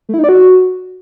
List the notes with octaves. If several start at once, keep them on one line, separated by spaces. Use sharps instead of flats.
A3
E4
D#4
D5
F#4